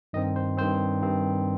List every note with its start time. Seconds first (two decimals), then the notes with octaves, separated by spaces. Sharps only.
0.13 G2 D#3 C4 D#5
0.36 C5
0.58 G2 D#3 C4 C5
1.02 G2 D#3 C4